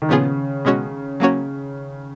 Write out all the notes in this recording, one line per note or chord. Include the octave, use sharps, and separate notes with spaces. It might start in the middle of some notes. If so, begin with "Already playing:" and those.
D#3
A#2 C#3 F3 B3 F4 G#4
B2 G#3 C#4 F#4 C#5
F#3 A#3 C#4 F#4 C#5